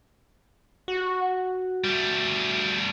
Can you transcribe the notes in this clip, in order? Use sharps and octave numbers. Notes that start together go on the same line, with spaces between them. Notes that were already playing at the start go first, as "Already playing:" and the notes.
F#4
G3 A3